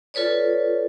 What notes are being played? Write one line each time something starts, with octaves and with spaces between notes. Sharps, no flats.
F4 A4 B4 C#5 D5